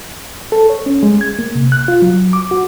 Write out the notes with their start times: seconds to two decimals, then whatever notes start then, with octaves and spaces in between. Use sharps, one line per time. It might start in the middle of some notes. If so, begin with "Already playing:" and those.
0.52 A4
0.69 C#5
0.86 C#4
1.03 G#3
1.21 G#6
1.39 A#3
1.55 C3
1.72 F#6
1.88 F4
2.02 F#3
2.33 D6
2.51 F#4